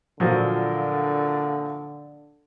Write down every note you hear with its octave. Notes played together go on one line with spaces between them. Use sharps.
A#2 D3 F3 F#3